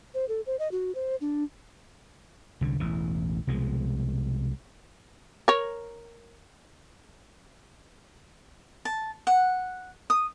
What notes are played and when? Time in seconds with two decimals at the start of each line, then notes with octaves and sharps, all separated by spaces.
0.14 C5
0.29 A4
0.46 C5
0.59 D#5
0.72 F#4
0.95 C5
1.21 D4
2.61 C2 D3
2.80 E1 A1 E3
3.47 C2 B2 F3 G#3
5.48 A#4 C#5
8.85 A5
9.27 F#5
10.10 D#6